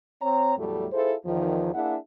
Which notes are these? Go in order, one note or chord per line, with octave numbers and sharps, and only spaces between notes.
C4 C#5 A#5
E2 A2 F#3 G3 A3
E4 F4 G#4 A4 C5
E2 D#3 F3
A#3 D4 E4 G#4 E5 F#5